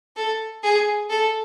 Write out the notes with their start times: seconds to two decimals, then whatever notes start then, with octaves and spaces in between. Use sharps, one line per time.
0.16 A4
0.63 G#4
1.10 A4